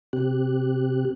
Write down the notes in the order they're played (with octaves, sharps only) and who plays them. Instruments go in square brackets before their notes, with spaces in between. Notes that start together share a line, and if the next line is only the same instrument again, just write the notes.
[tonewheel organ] C3 C4 G4 F#6